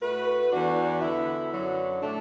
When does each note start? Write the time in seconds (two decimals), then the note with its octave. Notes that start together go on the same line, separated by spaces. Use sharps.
0.01 A2 A3 F#4 B4
0.51 E2 E3 D4 F#4
1.01 D3 B3 E4
1.51 F#2 D3 F#3
2.01 A2 A3 D4